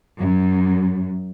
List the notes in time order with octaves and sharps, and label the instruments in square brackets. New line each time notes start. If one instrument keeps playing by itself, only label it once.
[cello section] F#2